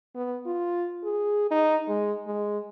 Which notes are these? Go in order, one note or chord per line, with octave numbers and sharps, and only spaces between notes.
B3
F4
G#4
D#4
G#3
G#3